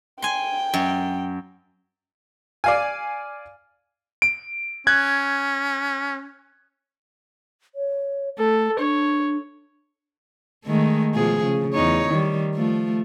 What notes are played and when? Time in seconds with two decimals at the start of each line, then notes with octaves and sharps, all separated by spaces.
0.22 G5 G#5 C6
0.74 F#2
2.64 D5 F5 G#5
4.22 D7
4.87 C#4 F#6 G#6
7.75 C#5
8.38 A3 A4
8.78 D4 C#5
10.65 D#3 G#3 A3
11.14 B2 F3 G#4
11.44 C#3
11.73 E2 D#4 C#5
12.10 D#3 G3
12.55 F3 A3